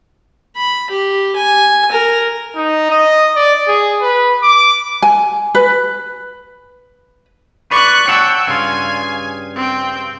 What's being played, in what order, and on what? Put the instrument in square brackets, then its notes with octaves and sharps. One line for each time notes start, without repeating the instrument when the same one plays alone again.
[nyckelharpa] B5
G4
G#5
A#4
[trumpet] D#4
D#5
D5
G#4
B4
D6
[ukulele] G#5
B4
[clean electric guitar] B4 D5 [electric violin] C#6 F#6
[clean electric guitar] C#5 F#5 A5 [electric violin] G5 E6
[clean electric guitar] G2 C#3 F4 [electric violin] G#5
[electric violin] C4 G5